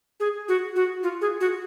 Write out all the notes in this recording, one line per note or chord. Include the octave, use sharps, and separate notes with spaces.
G#4
F#4
F#4
F4
G#4
F#4